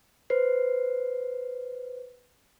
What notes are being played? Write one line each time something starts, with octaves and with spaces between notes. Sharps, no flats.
B4 C5 C7